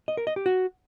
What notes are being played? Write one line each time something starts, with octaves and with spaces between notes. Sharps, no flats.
D#5
A#4
D#5
G4
F#4